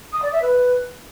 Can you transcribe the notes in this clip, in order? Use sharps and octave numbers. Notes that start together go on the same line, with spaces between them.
D#6
D5
E5
B4